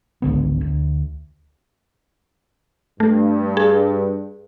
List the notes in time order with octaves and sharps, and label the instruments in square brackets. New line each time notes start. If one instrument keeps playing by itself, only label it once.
[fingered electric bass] G#1 C#2 D3 B3
D2
[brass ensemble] G2 [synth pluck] A3
[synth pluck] G#4